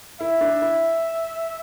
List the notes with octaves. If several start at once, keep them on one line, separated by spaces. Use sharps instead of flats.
E4 E5
D4
E4